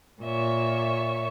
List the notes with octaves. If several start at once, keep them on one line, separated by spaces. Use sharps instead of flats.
A#2 C#5 E5 C#6